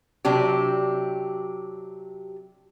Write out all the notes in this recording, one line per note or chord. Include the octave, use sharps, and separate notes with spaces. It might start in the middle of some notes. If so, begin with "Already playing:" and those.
C3 F#3 D4 G4